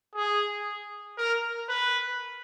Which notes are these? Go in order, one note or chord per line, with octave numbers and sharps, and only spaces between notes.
G#4
A#4
B4